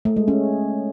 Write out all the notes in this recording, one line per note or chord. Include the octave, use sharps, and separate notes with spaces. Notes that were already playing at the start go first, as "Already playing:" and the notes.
A3
G#3
C#4